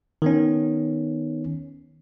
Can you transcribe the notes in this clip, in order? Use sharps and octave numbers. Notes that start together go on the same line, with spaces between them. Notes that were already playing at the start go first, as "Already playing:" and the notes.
D#3 B3 C#4